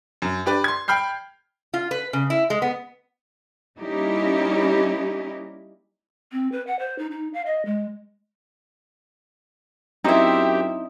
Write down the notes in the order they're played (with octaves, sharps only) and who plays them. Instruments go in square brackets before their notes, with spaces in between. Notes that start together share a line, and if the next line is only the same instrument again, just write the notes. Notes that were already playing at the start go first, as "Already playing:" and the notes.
[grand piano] F#2
D4 G4 B4 D5
C6 G#6
G5 B5 F6 G6 C7
[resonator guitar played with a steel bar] F4
B4
C#3
E4
G#3
B3
[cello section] G3 A#3 C#4 D#4 E4 G4
[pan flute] C4
B4
F#5
C5
D#4
D#4
F5
D#5
G#3
[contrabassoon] F#2 [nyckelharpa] C4 E5 [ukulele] D#4 E4 [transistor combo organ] G4